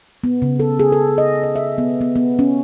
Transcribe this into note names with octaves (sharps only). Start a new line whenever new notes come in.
B3
C#3
A4
G#4
A4
D#5
D#5
E5
B3
B3
B3
C#4